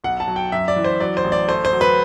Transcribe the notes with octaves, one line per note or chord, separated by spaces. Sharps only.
B1 F#5
A5
F#3
G5
F#2 E5
D5
E3
C5
F#3 D5
C5
A1
D5
A3 C5
C5
F#3
B4